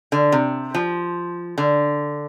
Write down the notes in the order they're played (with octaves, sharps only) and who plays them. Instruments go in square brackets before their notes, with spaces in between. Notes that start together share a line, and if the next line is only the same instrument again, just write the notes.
[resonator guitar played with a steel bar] D3
C3
F3
D3